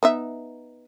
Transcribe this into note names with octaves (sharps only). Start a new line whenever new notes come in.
B3 D#4 E5